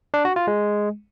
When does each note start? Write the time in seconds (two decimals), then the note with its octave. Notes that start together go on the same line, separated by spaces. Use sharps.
0.14 D4
0.25 F#4
0.36 F4
0.47 G#3